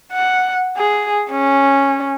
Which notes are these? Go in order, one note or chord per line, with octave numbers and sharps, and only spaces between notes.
F#5
G#4
C#4